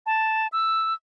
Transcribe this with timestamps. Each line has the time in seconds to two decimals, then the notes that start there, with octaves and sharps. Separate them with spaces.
0.06 A5
0.52 E6